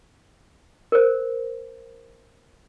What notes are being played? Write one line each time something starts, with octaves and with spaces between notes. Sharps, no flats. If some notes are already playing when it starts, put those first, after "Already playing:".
A#4 C5